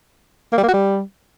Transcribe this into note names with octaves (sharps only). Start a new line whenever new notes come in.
A#3
G3
A#3
F#4
G3